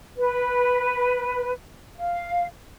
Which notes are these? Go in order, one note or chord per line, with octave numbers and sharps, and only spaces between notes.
B4
F5